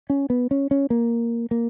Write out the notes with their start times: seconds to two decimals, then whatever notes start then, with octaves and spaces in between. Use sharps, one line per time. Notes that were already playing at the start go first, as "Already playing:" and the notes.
0.10 C#4
0.30 B3
0.51 C#4
0.71 C#4
0.90 A#3
1.51 A#3